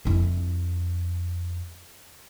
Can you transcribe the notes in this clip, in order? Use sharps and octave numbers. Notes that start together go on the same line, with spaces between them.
F2 E4